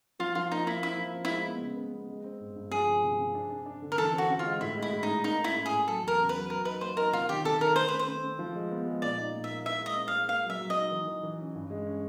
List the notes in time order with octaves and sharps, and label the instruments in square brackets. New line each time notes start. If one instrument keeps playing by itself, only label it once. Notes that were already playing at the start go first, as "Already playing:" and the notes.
[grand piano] F3 [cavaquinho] F4
[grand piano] F3 [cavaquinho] F4
[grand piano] A#3 [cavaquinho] D#4
[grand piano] A#3 [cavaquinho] E4
[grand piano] C4 [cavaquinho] E4
[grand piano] F3
C4
[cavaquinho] E4
[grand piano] G#3
B3
C#3
B3
B3
G#3
C4
G2
G2
[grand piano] F3 [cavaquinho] G#4
[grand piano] C3
C3
C3
D4
D4
D4
D3
[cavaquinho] A#4
[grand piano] E3 [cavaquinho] A4
[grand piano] C4
[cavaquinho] F#4
[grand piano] C4
[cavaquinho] F4
[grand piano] G#3
[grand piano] A2 [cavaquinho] E4
[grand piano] G#3
[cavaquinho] E4
[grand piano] A2
[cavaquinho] D#4
[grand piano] A2
[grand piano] A#3 [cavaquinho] D#4
[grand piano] C#4 [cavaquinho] E4
[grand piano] A2
[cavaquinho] G#4
[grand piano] A2
[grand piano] F#3 [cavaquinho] A4
[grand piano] E2 [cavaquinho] A#4
[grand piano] C#3
[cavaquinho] B4
[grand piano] F#3
[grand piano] F#3 [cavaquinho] A#4
[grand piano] D#4 [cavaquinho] B4
[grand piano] A#3 [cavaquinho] C5
[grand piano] D#4 [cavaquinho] A#4
[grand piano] C3 [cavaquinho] F4
[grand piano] D#3 [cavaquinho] G4
[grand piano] C3 [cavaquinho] A4
[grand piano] D#3 [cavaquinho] A#4
[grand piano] A3 [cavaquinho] C5
[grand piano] C4 [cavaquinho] B4
[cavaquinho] C5
[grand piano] C4
C4
F3
G#3
B3
G#3
[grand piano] A#2 [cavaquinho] D5
[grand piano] D#4
A#2
[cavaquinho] E5
[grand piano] A#3
[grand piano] E4 [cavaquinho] E5
[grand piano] G#3
[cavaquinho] D#5
[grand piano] C4
[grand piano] G#3 [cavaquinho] F5
[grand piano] A#3 [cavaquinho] F5
[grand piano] F#3
[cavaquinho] E5
[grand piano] F#3
[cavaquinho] D#5
[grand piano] D#4
E3
E3
E3
C#4
G2
G#3
C#4